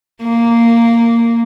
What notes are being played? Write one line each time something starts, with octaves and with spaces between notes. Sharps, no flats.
A#3